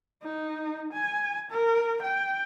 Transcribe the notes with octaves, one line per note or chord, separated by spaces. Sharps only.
D#4
G#5
A#4
G5